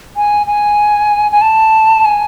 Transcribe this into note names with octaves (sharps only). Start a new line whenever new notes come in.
G#5
G#5
G#5
A5
G#5